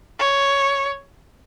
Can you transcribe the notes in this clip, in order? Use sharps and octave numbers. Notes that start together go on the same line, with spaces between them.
C#5